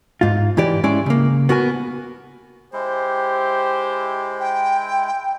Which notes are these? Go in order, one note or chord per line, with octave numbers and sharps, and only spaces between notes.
G#2 F4
G#2 E3 G4 D5
G#3 C#4 E4 D5
C#3 A#3
B3 F#4 A#4 G#5
G#3 E4 G4 C5
G5